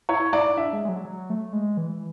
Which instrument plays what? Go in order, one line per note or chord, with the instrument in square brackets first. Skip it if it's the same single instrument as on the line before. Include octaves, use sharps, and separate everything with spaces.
[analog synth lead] E4 [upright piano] C#5
[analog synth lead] E4 [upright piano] D5
[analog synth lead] D4 [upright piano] E5
[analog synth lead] G#3
G#3
F#3
F#3
A3
G#3
E3